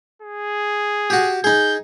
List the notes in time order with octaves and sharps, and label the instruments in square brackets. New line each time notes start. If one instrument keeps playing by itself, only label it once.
[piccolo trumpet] G#4
[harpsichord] F#4 G4
[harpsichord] D#4 G#4 [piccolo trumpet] G6